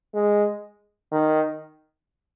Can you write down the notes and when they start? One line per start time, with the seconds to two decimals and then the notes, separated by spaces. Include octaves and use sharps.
0.14 G#3
1.12 D#3